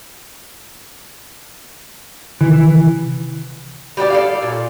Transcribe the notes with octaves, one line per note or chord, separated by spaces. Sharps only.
C3 D#3 E3
G3 D4 G4 D5
A4 D5 F5
A#2